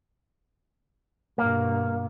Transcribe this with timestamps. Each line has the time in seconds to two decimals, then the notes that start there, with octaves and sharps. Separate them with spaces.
1.38 G2 B2 A#3